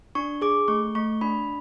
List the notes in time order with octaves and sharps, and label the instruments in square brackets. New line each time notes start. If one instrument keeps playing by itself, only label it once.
[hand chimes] D4 C#6
G#4 D6
A3 C#6
A3 C#6
D4 B5